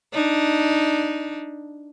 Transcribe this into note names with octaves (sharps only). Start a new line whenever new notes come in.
D4 D#4